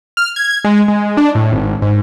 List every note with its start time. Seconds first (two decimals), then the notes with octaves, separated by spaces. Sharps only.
0.17 F6
0.36 G#6
0.64 G#3
0.88 G#3
1.17 D4
1.35 A2
1.53 G#1
1.82 G#2